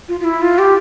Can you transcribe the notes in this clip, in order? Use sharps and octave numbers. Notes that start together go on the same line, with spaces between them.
F4
F4
E4
F4
G4